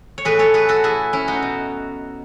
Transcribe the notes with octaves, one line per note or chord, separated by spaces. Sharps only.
C#5
A2 E3 G#4 B4
A4 C#5
G#4 B4
F#4 A4
E4 G#4
C#4 E4
D#4 F#4
B2